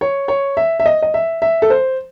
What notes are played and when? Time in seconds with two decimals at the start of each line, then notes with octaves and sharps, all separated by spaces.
0.01 C#5
0.28 C#5
0.57 E5
0.80 E5
0.86 D#5
1.02 D#5
1.14 E5
1.42 E5
1.62 A4
1.70 C5